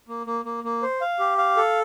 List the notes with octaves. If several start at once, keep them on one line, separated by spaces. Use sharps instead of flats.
A#3
A#3
A#3
A#3
C5
F5
G4
F5
A4